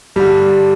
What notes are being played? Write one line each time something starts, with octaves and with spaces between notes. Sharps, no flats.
G2 D3 G3